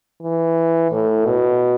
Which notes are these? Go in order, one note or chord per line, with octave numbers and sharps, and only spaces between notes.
E3
A2
B2